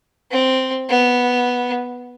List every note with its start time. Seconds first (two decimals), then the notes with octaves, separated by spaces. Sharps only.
0.31 C4
0.89 B3